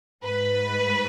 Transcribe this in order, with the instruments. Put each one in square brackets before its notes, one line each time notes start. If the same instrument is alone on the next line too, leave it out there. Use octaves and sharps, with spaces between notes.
[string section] G#2 B4